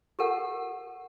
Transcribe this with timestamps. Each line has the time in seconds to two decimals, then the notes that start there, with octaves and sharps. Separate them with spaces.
0.19 G4 A4 A#4 F#5